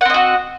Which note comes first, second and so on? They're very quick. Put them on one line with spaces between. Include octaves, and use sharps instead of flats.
F#5 C4 D#5 F#4